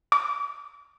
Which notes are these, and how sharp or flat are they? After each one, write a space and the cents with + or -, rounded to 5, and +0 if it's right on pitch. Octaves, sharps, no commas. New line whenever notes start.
D6 -45